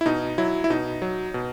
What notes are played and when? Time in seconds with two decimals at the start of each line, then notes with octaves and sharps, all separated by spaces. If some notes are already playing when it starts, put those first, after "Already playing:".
0.01 E4
0.06 B2 D#4
0.38 F#3 E4
0.64 E4
0.70 B2 D#4
1.02 F#3
1.34 B2